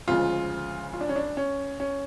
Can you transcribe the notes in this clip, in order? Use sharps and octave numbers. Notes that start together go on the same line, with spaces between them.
D2 C#3 F3 G#3 F4
F4
D4
C#4
D4
C#4
C#4